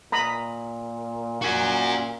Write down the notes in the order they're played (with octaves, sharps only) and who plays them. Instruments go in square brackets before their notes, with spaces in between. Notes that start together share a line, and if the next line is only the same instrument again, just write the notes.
[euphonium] A#2 [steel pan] A#5 B5 D#6
[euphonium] A#2 [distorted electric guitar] F#4 G#5